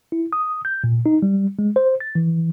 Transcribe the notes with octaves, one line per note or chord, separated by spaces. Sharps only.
E4
D#6
G6
A#2
D#4
G3
G#3
C5
A6
E3